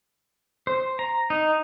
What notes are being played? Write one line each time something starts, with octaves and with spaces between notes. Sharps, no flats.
C5
A#5
D#4